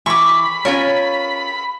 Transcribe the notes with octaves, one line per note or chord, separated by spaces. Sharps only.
E3 B5 C#6 D6
C#4 F4 A#4 C#5